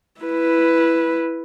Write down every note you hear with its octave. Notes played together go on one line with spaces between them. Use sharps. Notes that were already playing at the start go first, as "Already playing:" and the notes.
E4 B4